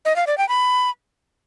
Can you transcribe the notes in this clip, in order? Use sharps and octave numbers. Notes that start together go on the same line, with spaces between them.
D#5
F5
D5
G5
B5